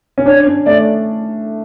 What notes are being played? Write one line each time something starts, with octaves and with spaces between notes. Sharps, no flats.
C#4
D4 C#5
C#4
A3 D5